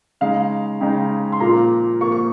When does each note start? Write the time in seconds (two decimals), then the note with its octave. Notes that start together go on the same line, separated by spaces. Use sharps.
0.21 C#3 G#3 D#4 F5
0.81 C#3 G#3 D#4 G5
1.32 C6
1.40 A#2 F3 A#3 F4 A#5
2.01 A#2 F3 A#3 F4 C#6
2.12 C#6